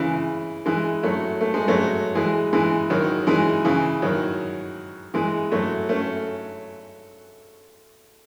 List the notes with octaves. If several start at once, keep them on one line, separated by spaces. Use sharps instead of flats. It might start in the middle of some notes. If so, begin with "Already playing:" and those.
Already playing: C#3 E3 G#3
E3 G#3
F#3 A3
A3
G#3
F#3 A3
E3 G#3
E3 G#3
D#3 F#3
E3 G#3
C#3 E3
D#3 F#3
E3 G#3
F#3 A3
A3 C#4